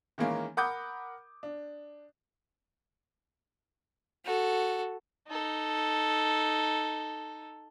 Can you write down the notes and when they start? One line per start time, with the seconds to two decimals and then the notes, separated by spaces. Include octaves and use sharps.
0.18 D#3 E3 G#3 A#3 C#4
0.57 A#4 F#5 B5 D6 D#6 G6
1.43 D4
4.25 F#4 A4
5.28 D#4 A4